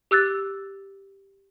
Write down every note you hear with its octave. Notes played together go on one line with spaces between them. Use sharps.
G4 E6 F#6 A6